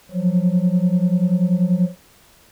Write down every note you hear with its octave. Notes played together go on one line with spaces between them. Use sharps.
F3 F#3